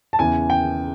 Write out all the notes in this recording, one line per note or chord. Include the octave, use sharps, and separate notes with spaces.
A5
E2 C#3 E3 G#5
G5